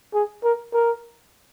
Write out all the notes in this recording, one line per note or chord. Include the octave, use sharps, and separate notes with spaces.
G#4
A#4
A#4